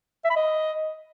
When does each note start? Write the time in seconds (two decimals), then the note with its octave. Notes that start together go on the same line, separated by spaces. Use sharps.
0.24 E5
0.30 B5
0.36 D#5